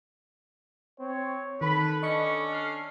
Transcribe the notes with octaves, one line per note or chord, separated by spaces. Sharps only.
C4 C#5
D#3 A4 B4 B5
C#4 D4 D#5 C#6 C#7
F6 C7